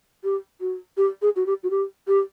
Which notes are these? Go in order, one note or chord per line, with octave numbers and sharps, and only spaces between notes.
G4
F#4
G4
G#4
F#4
G4
F#4
G4
G4